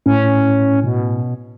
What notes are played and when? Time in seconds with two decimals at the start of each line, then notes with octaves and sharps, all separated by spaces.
0.06 A2 C#4
0.84 B2